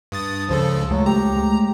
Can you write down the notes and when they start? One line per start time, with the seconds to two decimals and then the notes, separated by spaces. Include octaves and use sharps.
0.12 G2 D#6 A6
0.49 C#2 C#3 F3 A4
0.90 C#2 F#3 G#3 A3
1.06 G4 A#5
1.36 G#3 A3